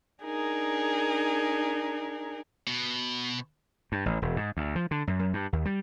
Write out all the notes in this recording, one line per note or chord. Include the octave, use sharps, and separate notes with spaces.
D4 D#4 G#4 A#4
B2
G2
A1
E1
G#2
D2
F3
D3
F#2
F#2
G2
D#2
G3